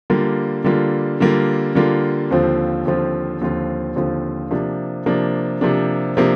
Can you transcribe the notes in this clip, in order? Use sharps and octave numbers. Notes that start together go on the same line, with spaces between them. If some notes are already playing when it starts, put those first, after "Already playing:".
D3 G3 A#3 F4
D3 G3 A#3 F4
D3 G3 A#3 F4
D3 G3 A#3 F4
D#2 D3 F3 C4 F4
D#2 D3 F3 C4 F4
D#2 D3 F3 C4 F4
D#2 D3 F3 C4 F4
C3 F3 A#3 D4
C3 F3 A#3 D4
C3 F3 A#3 D4
C3 F3 A#3 D4